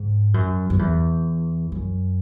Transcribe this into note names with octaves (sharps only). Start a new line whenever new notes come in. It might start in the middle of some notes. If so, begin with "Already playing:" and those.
Already playing: G#2
F#2
F#2
E2
F#2